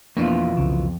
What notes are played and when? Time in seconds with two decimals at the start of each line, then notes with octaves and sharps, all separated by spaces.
0.17 F2 B2 E3 A#3 B3 D4 F4
0.57 C2 C#3